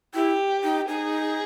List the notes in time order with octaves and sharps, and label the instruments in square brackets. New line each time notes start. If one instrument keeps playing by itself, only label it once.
[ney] E4 [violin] G4
[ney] D#4
[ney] D#4 [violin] G#4